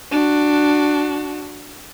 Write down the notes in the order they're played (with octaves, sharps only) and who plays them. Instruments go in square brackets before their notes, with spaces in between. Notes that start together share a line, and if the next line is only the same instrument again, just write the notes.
[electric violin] D4 F#4